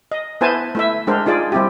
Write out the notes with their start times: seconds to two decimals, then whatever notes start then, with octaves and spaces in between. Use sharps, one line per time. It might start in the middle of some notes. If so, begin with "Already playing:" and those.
0.12 D#5
0.41 B3 E4 B4 C5 G#5 A5
0.75 A3 E4 E5
1.07 G#3 D4 A#4 C5
1.26 D#4 F4 G#4 D5
1.52 G3 C4 E4 G4